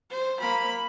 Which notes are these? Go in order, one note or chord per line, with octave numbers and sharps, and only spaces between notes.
C5
A#3 B5